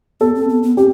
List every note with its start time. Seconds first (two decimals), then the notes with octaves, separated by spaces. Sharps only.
0.21 B3 A4
0.35 C4
0.50 B3
0.63 B3
0.77 C4 G4